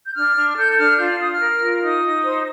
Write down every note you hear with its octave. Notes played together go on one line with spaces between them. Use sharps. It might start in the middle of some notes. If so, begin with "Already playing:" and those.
G6
D4 F6
D4
A4 G6
G6
D4 F6
F4 G6
F6
F4 D#6
F6
A#4
F4
D#4 D#6
D#4
C5